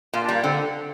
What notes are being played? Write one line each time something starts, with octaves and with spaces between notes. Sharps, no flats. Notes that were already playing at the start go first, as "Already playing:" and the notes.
A#2 F4
D4
G3
A#3
D3 C4